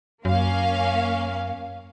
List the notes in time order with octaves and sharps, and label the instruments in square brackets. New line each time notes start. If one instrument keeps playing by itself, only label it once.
[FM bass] F#2 [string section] A#3 C#4 F5